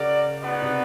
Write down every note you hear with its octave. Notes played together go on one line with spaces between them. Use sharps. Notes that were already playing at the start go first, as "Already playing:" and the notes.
Already playing: C#3 F#4 A#4 D5
B3 D#4 F#4 B4 D5
C3